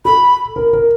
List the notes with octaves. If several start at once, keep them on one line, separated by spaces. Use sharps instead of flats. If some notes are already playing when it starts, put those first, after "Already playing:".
A4 B5
A#4
A#4